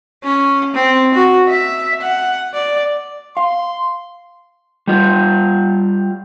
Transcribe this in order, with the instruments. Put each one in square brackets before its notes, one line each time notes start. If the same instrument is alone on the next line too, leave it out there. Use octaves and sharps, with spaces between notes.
[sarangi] C#4
C4
F#4
E5
F#5
D5
[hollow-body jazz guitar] F5 [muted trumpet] C6
[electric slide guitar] G3 F4